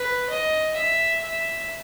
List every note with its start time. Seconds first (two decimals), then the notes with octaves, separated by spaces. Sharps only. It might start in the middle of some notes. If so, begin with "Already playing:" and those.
Already playing: B4
0.30 D#5
0.76 E5
1.21 E5